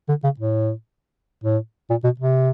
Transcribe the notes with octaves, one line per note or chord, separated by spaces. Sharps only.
D3
C#3
A2
A2
A#2
B2
C3